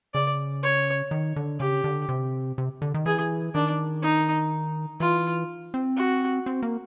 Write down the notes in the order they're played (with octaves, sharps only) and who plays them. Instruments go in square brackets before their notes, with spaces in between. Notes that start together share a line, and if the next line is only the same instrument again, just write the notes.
[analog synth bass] C#3 [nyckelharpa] D5
[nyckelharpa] C#5
[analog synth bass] D#3
D3
[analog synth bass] C#3 [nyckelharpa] G4
[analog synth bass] D3
C3
C3
D3
D#3
[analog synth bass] E3 [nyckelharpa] G#4
[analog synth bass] D#3 [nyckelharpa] D4
[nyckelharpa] D#4
[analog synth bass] E3 [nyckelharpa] F4
[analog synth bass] C4
[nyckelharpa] F#4
[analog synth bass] C4
A#3